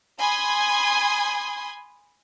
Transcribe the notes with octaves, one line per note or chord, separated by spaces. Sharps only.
G#5 B5 C6 D#6 G#6